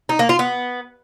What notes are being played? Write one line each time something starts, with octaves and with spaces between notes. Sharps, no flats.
D#4
A#3
F4
B3